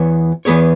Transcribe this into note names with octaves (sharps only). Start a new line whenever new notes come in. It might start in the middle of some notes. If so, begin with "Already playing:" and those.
Already playing: E2 E3 B3 C#5
E2 E3 B3 G#4 C#5